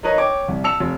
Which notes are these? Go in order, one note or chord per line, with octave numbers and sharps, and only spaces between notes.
D#4 A#4 B4 C#5 D#5
C#5 G5 D6
C2
A5 E6 C#7 F7
F1